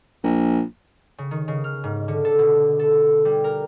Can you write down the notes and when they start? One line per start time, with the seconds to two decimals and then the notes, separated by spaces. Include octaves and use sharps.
0.23 A#1
1.18 C#3
1.31 D#3
1.48 C#3
1.64 F6
1.84 G#2
2.08 D3
2.25 A4
2.39 B2
2.79 A4
3.25 G3
3.44 A#4